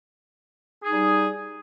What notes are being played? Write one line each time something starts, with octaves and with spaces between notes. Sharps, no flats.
G3 D#4 G#4